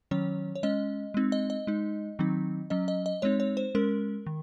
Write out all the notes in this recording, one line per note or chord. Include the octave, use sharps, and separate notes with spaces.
D#3 F#3 C#4 C#5
C#5
G#3 C#4 D#5
G#3 C4 D#4
D#5
D#5
G#3 D#4
D#3 F#3 C4 D#4
F#3 C#4 D#5
D#5
D#5
G#3 C4 D#4 C#5
C#5
C5
G#3 C#4 A#4
D#3